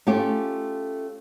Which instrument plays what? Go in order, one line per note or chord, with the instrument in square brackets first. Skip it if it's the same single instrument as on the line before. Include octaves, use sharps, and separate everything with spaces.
[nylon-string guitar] A3 C#4 F4 G4